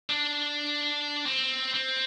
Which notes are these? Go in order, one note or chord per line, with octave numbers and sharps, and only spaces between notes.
D4
C4
C4